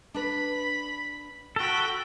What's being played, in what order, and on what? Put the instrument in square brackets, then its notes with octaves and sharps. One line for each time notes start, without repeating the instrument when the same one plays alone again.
[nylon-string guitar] D4 B4 [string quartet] B5
[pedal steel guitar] F#4 A4 [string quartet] G5 B5